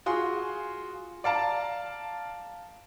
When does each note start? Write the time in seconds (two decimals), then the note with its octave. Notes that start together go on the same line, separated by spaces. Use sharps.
0.06 F4 F#4 G#4 C6
1.24 D5 F5 A5 A#5